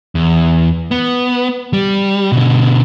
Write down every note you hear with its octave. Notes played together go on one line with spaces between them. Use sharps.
E2
B3
G3
B2 D3